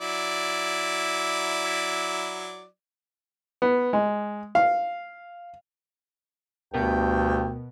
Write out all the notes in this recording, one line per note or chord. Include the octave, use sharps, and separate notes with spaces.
F#3 E4 D5
B3
G#3
F5
D2 G2 B2 B3 A#4 G5